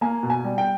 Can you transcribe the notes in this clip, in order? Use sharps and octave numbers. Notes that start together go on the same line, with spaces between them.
A#3 G#5
B2
G#5
G3
G5